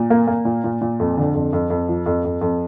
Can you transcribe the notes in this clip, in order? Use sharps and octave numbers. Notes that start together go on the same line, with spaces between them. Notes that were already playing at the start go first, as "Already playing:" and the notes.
Already playing: A#2
A#3
A#3
A#2
A#2
A#2
F2
D3
F2
F2
F2
F3
F2
F2
F2